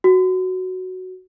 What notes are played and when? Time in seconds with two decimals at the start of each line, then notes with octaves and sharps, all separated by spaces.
0.04 F#4